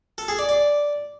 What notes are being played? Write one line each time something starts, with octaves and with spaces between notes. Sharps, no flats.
A4
G#4
D5
D5